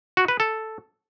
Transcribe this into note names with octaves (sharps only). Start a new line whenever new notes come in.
F#4
B4
A4